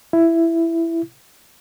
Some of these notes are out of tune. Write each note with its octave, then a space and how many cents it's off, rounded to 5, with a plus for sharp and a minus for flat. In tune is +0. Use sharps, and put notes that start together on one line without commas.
E4 +10